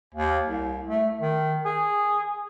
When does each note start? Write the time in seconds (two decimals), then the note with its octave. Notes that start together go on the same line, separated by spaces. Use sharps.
0.14 D#2
0.45 C2
0.86 A3
1.21 D#3
1.65 G#4